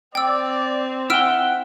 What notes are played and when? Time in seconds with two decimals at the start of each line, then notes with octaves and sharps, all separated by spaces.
0.15 C4 D5 G5 E6
1.10 E4 F#5 G5 E6 F6 D7